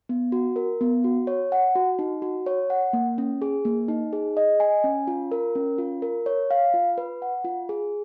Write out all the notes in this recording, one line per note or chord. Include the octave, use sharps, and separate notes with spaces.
B3
F#4
A#4
B3
F#4
C#5
F#5
F#4
D#4
F#4
C#5
F#5
A#3
C#4
G#4
A#3
D#4
G#4
D#5
G#5
C#4
F4
A#4
C#4
F4
A#4
C#5
F5
F4
B4
F#5
F4
G#4